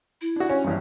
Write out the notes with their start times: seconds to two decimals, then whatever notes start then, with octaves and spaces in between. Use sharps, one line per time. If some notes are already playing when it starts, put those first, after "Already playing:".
0.21 E4
0.36 D4 F#4
0.49 C#4
0.64 A#1 G2